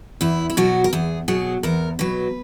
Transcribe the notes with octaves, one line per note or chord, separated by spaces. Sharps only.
E2 E4
E4
B2 F#3 F#4
A#4
E2 G#4
B2 F#3 G#4
E2 A#4
B2 F#3 B4